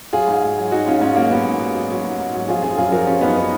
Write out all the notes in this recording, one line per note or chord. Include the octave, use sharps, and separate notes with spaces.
F#3 F4 G#4
G#2
G#2
F#3
F#3 D#4 F#4
G#2 C#4 F4
G#2 C#4 F4
F#3 A#3 C#4
F#3 B3
G#2
G#2
F#3
F#3
G#2
G#2
F#3
F3 F4 G#4
F#2 F4 G#4
F#2 F4 G#4
F3 F#4 A#4
F3 C#4 F4
F#2 B3 D#4
B3 D#4